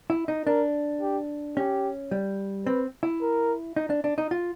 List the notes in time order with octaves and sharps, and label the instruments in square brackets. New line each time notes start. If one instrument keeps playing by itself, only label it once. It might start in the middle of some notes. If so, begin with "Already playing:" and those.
[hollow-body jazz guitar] E4
D#4
[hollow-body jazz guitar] D4 [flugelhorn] A#4
[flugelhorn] G4
[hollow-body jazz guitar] C#4 [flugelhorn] G4
[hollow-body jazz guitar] G3
[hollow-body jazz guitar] C4 [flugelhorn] B4
[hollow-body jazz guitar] E4
[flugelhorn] A#4
[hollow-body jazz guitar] D#4
D4
D4
D#4
F4